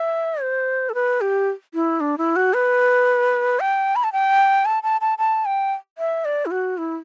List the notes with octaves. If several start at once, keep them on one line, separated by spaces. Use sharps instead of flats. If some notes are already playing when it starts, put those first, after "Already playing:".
Already playing: E5
C5
A4
B4
G4
E4
D4
E4
F#4
B4
G5
B5
A5
G5
A5
A5
A5
A5
G5
E5
D5
E4
F#4
E4